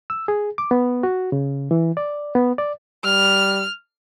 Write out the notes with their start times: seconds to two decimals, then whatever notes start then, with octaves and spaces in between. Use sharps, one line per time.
0.10 E6
0.28 G#4
0.58 D6
0.71 B3
1.03 F#4
1.32 C#3
1.71 E3
1.97 D5
2.35 B3
2.58 D5
3.04 G3 F6